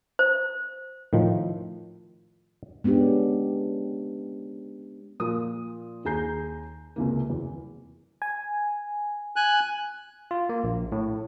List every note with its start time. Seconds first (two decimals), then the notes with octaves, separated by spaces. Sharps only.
0.19 C5
1.13 A2 D#3 F3
2.84 G#3 B3 C#4 D4 G4
5.20 A#2 F3 F4 A#4 D#6
6.05 D#2 G#4 G#5 A#5 G6 C7
6.96 C#2 C3 A#3
7.30 E2
8.22 G#5
9.36 G#5 F#6
10.31 F4
10.49 A#3
10.64 A#1
10.92 A2